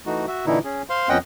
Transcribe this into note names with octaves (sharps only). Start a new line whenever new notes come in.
E3 A3 D#4 F#4
F#4 E5
A#2 D3 E3 D#4 E4
C#4 G#4
C5 F5 C6
F2 B3 C#4 D#5 F#5 G5